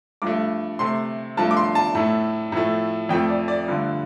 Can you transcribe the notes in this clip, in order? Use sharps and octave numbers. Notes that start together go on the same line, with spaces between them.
G2 F3 A3 D6
C3 A3 C6
G2 F3 A3 A5
D6
C6
A5
A2 A3
A2 F3 A3
F2 F3 A3 G5
D5
D5
G2 D3 F3 A3